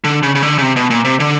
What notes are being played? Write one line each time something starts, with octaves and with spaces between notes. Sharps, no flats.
D3
C#3
C#3
D3
C#3
C3
B2
A#2
C3
D3